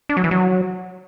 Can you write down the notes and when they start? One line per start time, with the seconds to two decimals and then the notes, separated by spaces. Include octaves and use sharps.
0.09 D4
0.17 F#3
0.24 E3
0.31 F#3